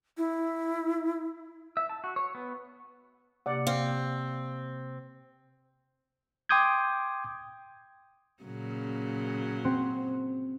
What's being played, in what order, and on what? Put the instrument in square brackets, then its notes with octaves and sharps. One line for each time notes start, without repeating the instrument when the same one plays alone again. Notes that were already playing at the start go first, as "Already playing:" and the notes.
[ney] E4
[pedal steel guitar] E5
A5
F#4
C#5
B3
[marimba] C3 A#3 G4 [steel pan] D5 F#5
[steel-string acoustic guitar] C4 [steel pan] F5
[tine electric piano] G5 C6 D6 D#6 G6 G#6
[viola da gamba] A#2 C#3 F#3
[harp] C4 F#4